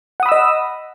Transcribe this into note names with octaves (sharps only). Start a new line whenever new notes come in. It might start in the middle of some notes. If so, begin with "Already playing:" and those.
D#5 F#5 B5 D#6 E6